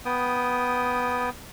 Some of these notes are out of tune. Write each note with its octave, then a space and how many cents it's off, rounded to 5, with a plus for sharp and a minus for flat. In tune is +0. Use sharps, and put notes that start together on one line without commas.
B3 +0 G5 +0 D#6 +0